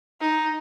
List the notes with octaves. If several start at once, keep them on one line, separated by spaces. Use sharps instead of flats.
D#4